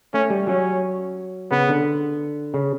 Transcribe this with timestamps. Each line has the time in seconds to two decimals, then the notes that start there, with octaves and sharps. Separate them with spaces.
0.14 A3 C#4
0.30 G3
0.47 F#3 C#4
1.51 C#3 B3
1.69 D3
2.54 C#3